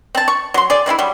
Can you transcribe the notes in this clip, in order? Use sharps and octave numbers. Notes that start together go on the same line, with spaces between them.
C4 A5
C#6
F#3 C6
G#4 D5
E3 G#3 C4 E4
F#3 G3